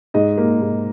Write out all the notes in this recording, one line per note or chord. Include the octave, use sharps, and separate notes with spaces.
G#2 D#5
A#3
G#2